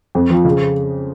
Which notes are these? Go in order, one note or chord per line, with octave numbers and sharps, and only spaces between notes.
F2
F3
C#3